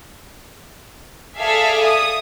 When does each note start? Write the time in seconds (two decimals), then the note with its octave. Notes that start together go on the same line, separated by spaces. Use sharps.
1.39 G#4 A4 D5 E5 F5
1.86 D#6